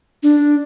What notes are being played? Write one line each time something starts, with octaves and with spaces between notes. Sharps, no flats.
D4